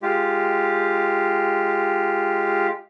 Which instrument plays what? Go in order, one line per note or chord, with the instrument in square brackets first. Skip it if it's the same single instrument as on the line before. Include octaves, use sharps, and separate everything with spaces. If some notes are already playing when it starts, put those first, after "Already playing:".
[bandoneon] G#3 F4 G4